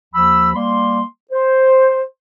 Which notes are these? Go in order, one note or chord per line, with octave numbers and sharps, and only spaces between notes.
D#2 F3 B5 E6
G3 A#3 C6
C5